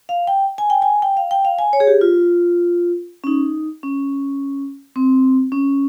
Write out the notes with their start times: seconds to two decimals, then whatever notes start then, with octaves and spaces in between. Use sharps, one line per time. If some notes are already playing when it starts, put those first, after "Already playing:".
0.09 F5
0.27 G5
0.58 G#5
0.70 G5
0.82 G#5
1.02 G5
1.17 F5
1.31 G5
1.45 F5
1.59 G#5
1.73 C#5
1.80 G#4
1.87 G4
2.01 F4
3.24 C#4
3.27 D#4
3.83 C#4
4.96 C4
5.52 C#4